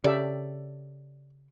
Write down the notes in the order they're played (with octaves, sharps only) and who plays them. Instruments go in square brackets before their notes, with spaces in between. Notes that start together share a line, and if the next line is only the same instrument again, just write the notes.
[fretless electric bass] C#3 [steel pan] G4 A4 E5 [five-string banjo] D5